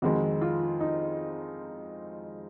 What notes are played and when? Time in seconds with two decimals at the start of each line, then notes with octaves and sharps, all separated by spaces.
0.02 F2 D#3 G#3 F#4
0.42 F4
0.80 D#4